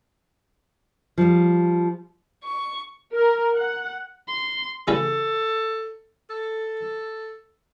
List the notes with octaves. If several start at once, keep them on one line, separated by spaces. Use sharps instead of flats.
F3 G3
C#6
A#4
F#5
C6
A1 C#3 C#4 A4
A4